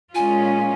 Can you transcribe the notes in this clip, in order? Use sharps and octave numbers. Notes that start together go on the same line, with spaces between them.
A#2 G#3 C#4 F4 G#5